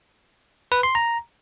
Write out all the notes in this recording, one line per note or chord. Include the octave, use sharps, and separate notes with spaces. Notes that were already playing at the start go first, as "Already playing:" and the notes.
B4
C6
A#5